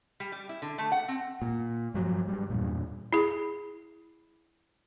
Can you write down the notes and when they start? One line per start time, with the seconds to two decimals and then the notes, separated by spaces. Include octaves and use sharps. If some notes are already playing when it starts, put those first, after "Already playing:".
0.20 G3
0.32 G3
0.49 E4
0.62 D3
0.78 A3
0.92 F#5
1.08 C4
1.42 A#2
1.94 G2 F3 F#3
2.28 G#2 G3
2.50 E2 G2 A#2
3.13 E4 G#4